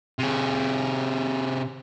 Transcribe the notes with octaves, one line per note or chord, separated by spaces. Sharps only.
C3 G#4